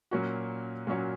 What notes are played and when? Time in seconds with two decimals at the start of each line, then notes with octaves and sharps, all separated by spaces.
0.11 A#2 F#3 A#3 C#4 F#4
0.87 A#2 F#3 A#3 C#4 F#4